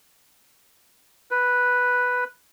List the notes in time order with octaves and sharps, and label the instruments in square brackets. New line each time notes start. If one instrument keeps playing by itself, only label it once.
[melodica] B4